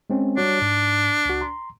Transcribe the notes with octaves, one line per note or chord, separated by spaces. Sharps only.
G#3 C4 C#4
G3 D4 F#4 C#5
G#2
C#2 F#4
A#5 C6